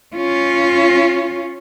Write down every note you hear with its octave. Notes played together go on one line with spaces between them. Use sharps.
C#4 F4